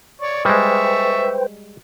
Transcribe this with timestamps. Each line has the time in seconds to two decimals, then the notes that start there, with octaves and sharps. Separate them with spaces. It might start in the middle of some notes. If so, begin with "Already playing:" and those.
0.22 C#5 D5 C#6
0.45 G3 G#3 B4 C5 E5 G5 C#6